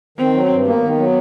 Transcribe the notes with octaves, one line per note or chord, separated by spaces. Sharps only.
D#3 C4
F#3
G2
A#3 B3
D#3
F#3